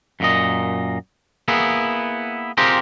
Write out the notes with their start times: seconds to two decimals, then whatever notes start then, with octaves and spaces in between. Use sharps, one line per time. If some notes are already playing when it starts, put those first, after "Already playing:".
0.20 F#2 A#2 D#5
1.48 A#3 B3 E4 G#4
2.57 C4 F4 G4 G#4 A#4